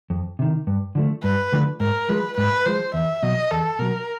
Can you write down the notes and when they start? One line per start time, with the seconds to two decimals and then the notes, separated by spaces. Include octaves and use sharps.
0.10 F2
0.39 C3 D#3
0.67 G2
0.95 D3 F3 A3
1.23 G2 B4
1.52 D3 F3 A3
1.80 G#2 A#4
2.09 F3 G#3 B4
2.37 G#2 B4
2.66 F3 G#3 C5
2.94 E2 E5
3.23 B2 F#3 D#5
3.51 E2 A4
3.79 B2 F#3 A#4